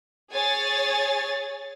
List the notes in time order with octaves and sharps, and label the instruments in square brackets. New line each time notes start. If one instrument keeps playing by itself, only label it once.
[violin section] G#4 C#5 G#5 A6